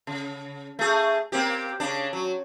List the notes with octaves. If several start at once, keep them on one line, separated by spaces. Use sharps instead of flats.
C#3
A3 G#4
A#3 C4 G4
C#3 D4
F#3